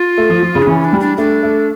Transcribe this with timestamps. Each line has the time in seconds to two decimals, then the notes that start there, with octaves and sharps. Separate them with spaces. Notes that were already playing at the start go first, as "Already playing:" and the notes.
Already playing: F4
0.18 A3
0.30 F3
0.43 F3
0.55 C#3
0.62 D4
0.67 E3 C#4
0.84 D4
0.93 G3
1.00 D4
1.17 A3 D4
1.43 A3